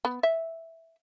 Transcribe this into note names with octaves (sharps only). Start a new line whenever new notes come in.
B3
E5